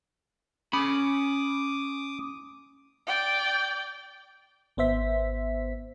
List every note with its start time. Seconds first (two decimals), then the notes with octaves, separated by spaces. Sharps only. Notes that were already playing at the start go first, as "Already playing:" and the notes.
0.73 C#4 B5 D6 D#6
3.07 D5 G5
4.77 G#1 B3 C5 E5 B6